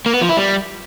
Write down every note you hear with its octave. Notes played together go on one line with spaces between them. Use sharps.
A#3
B3
F3
E4
G3